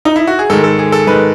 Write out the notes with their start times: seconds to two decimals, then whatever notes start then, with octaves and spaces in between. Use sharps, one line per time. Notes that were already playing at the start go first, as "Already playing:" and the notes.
0.05 D#4
0.16 E4
0.27 F#4
0.39 G#4
0.50 G#2 D#3 G#3 A4
0.64 A4
0.79 G#4
0.92 A4
1.07 G#2 D#3 G#3 B4